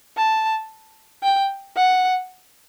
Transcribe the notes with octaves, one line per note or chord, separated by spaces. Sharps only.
A5
G5
F#5